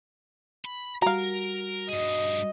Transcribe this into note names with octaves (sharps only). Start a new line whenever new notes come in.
B5
G3 F#4 A#4 F5 A#5
G2 G#4 D#5